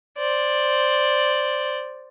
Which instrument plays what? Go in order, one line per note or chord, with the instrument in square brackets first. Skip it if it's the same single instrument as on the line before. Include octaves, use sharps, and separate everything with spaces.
[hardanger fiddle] C5 D5